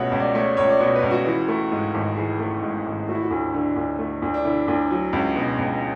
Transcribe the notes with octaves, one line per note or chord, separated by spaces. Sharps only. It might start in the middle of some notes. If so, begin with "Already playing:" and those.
Already playing: C#2 B2 A3 C#5 E5 F#5
C#2
D5
A3 C#5
C#2 C#5
D5
B2 C#5
B4
C#2
F#4
E3
A3
G#2
G#1
E3 G#4
A3
G#2
G#1
A3 F#4
E4
F#4
D2
D3
D2
A3
D2
D4
D3 E4
D2
F#3
C#2
B2
C#2